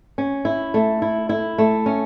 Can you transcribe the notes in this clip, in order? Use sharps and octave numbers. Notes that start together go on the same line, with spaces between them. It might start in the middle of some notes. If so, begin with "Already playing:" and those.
C#4
E4
A3
E4
E4
A3
C#4